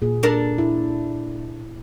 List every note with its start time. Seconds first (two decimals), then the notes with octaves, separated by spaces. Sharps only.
0.02 A#2 G#4
0.23 D4 A4 A#4
0.58 E4